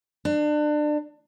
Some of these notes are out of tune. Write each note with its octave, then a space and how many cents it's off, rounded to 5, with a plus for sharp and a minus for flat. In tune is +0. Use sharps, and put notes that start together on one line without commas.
D4 +30